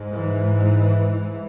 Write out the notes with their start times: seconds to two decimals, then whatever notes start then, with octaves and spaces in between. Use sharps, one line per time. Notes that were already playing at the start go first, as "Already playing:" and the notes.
Already playing: G#2
0.12 E3